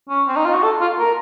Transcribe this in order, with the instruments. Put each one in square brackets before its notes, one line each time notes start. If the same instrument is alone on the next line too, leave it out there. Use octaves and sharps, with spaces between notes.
[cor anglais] C#4
C4
D#4
F4
F#4
A4
F4
A#4